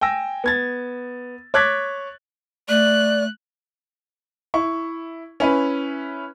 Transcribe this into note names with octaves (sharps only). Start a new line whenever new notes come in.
G5 G#5 E6 A#6
B3 G#6 A6
C#5 D6 F#6 G#6 A6 B6
A3 D5 F#6
E4 C#6
C#4 E4 B4